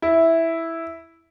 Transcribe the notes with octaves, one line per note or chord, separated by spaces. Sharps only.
E4